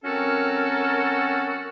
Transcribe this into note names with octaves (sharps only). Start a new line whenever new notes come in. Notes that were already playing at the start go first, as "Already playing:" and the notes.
F#3 C4 C#4 F#4 A4 A#4